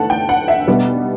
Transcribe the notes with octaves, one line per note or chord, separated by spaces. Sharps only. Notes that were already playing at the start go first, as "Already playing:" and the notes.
Already playing: E2 D3 A3 F#5 A5
G5
F#5
E5
B2 G3 B3